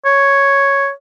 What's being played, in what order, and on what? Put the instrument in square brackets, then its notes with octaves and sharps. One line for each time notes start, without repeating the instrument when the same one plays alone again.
[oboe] C#5